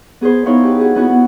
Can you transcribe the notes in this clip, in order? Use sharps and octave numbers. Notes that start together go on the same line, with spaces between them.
B3 G#4 B4 C5
B3 D#4 E4 C5 C#5 F5
G4 B4
F#4 G#4
B3 C#4 E4 F#4
B3